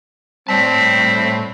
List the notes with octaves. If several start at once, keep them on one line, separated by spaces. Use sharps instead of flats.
A2 G3 C4 C#5 A5 B6